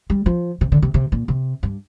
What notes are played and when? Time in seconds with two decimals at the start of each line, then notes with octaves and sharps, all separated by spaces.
0.10 G3
0.26 F3
0.61 C3
0.72 D3
0.82 C3
0.94 C3
1.12 A#2
1.28 C3
1.63 G2